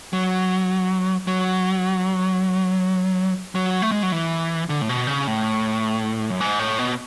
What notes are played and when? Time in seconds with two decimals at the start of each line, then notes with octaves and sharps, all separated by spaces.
0.13 F#3
1.27 F#3
3.55 F#3
3.82 A3
3.92 G#3
4.03 F#3
4.12 E3
4.69 D3
4.82 A2
4.89 B2
5.07 C#3
5.27 A2
6.30 F#2
6.41 G#2
6.59 A2
6.79 B2